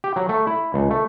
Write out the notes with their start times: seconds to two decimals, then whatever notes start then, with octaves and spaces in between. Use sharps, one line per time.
0.04 G4
0.16 F#3
0.29 A3
0.47 E4
0.74 C#2
0.91 A3